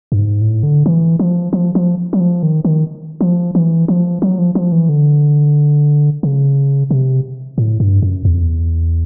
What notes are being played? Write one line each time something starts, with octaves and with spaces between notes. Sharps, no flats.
G2
G#2
A2
D3
E3
F3
F3
F3
F#3
F3
D#3
D#3
F3
E3
F3
F#3
F3
F3
E3
D3
C#3
C3
A2
G2
F#2
E2
F2
E2